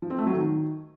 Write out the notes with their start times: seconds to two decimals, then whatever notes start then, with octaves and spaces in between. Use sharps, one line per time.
0.02 F3
0.10 C4
0.18 A3
0.27 F#3
0.35 D#3